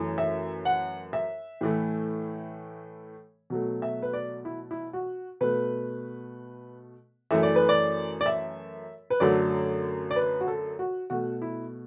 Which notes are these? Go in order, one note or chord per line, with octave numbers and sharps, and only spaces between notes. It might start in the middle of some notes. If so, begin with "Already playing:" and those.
Already playing: F#2 E3 A3
E5
F#5
E5
A2 E3 A3
B2 F#3 A3
E5
B4
D5
E4
E4
F#4
B2 A3 B4
F#2 E3 A3 E5
D5
B4
D5
D5
E5
B4
F#2 D3 F#3 A3 D5
D5
B4
F#4
A4
F#4
B2 A3 F#4
E4